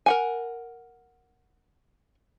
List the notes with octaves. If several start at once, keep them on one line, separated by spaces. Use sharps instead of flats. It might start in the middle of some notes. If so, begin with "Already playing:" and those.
A#4 F#5 G#5